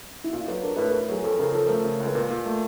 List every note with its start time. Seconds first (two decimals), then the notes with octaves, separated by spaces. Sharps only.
0.24 E4
0.33 A#2 F4
0.48 F#3 B4
0.63 D4 A#4
0.77 A2 B4
0.90 A2 A#4
1.08 F#3 G#4
1.24 F2 A4
1.39 C#3 A#4
1.52 F3 A4
1.66 A3 A#4
1.85 C#3
2.00 C#2
2.07 B4
2.15 A#2 A#4
2.30 A#2 A#4
2.46 A3